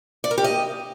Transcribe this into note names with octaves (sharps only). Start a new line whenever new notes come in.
D5
A#4
G4
D#5